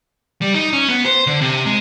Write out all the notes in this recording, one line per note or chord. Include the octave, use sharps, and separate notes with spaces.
G3
D#4
C#4
B3
C5
D3
C3
G#3